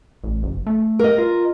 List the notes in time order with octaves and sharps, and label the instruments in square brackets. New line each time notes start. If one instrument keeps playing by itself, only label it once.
[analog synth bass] A1
F#1
A3
[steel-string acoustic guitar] A#4 D#5
[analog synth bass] F4